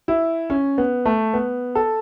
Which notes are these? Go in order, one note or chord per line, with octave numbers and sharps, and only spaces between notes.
E4
C#4
B3
A3
B3
A4